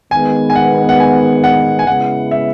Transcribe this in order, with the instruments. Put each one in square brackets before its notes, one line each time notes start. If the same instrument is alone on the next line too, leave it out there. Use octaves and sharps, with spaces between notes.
[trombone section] D#3 G#3 B3 [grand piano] G#5
[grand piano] G#5
F#5
F#5
G#5
F#5
G#5
[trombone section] C#3 G#3 B3 E4 [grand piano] F#5
[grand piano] E5